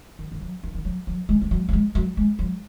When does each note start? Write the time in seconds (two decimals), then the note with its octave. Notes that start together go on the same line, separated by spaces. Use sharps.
0.19 D#3
0.32 D#3
0.41 F#3
0.63 D#3
0.75 D#3
0.85 F#3
1.07 F#3
1.29 G#3
1.42 G#3
1.51 F#3
1.69 F#3
1.73 G#3
1.95 F#3
2.17 G#3
2.39 F#3